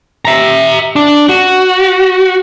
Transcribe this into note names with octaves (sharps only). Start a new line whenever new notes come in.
E5 A#5
D4
F#4